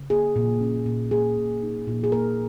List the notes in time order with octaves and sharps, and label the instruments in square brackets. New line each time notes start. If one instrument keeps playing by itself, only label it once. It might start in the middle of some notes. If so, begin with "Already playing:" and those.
Already playing: [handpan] C#3
A#3 G#4
A#2
C#4
A#2
A#3 G#4
A#2
D#4
A#2
G#4
A#3 A#4